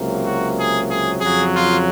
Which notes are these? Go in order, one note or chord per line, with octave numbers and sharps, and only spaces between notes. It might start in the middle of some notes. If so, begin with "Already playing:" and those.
Already playing: C#2 C3 F#3 A#3
F#4
G#4
G#4
F2 C#3 F#3 G#4
F4